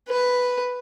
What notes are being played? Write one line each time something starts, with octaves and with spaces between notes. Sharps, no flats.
B4